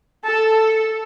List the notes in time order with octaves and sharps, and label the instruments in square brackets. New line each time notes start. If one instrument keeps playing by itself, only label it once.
[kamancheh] A4 [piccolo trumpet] A5